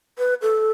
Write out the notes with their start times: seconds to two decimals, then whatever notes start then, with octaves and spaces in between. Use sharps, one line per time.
0.18 B4
0.42 A4